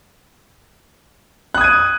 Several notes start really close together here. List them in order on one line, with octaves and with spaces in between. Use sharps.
F#6 D#6 G#6 D#7